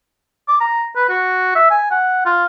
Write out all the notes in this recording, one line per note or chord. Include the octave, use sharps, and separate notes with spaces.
D6
A#5
B4
F#4
E5
G#5
F#5
F4